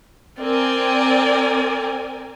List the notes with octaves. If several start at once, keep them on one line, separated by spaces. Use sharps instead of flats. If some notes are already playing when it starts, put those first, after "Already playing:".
C4 A#4 D5 G#5